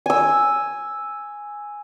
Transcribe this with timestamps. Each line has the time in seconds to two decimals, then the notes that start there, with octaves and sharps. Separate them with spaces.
0.06 G#5 E6